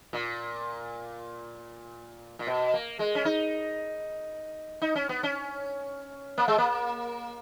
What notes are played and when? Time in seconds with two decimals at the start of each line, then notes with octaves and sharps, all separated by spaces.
0.13 A#2
2.39 A#2
2.47 B2
2.74 A#3
2.99 G#3
3.15 C#4
3.25 D#4
4.82 D#4
4.95 C#4
5.09 B3
5.23 C#4
6.38 A#3
6.48 G#3
6.58 A#3